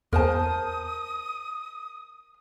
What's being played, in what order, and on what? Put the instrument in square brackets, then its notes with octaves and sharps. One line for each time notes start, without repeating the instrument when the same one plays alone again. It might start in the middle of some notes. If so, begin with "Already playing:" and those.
[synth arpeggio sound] E2 [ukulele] A#4 C5 A5 [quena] D#6